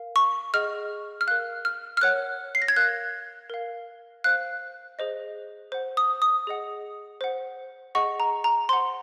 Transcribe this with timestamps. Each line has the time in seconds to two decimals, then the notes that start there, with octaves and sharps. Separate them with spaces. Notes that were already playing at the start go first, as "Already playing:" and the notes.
Already playing: A#4 F5
0.16 C#6
0.54 G#4 D#5 F#5 F6
1.21 F6
1.27 A#4 F5 F#6
1.65 F6
1.97 F6
2.01 A#4 C#5 F#5 F#6
2.55 C7
2.62 A#6
2.68 G#6
2.76 A#4 F5 F#6
3.50 A#4 F5
4.24 C5 F5 F#6
4.99 G#4 C5 D#5
5.72 C5 F#5
5.97 D#6
6.22 D#6
6.47 G#4 D#5 F#5
7.21 C5 F#5
7.95 G#4 D#5 F#5 C#6
8.20 A#5
8.44 A#5
8.69 C5 F#5 C6